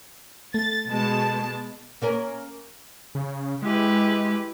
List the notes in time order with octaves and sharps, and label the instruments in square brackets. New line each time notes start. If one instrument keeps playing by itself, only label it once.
[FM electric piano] A3 [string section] A6
[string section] B2 G#3 A5
[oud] A#3 C#4 A#4
[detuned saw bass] C#3
[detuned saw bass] G#3 [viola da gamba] E4 G4 B4